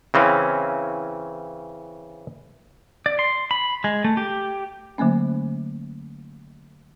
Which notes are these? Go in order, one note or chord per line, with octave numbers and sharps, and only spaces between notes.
C#3 E3 C4 C#4
D5
C6
B5
G#3
A3
G4
D3 F#3 A3 A#3 C#4